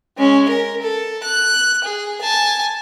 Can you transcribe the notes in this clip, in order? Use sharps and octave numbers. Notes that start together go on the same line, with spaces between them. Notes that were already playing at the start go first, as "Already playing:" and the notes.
G#3 C#4
A#4
A4
F#6
G#4
G#5 A5